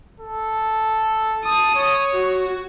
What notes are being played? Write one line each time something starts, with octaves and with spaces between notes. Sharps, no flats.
A4
A5 D#6
C#5
F#4